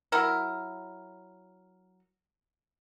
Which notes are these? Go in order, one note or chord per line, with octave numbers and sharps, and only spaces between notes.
F#3 E4 A#4